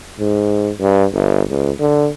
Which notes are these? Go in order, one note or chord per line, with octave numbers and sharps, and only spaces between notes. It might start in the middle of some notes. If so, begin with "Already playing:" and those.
G#2
G2
G1
C#2
D3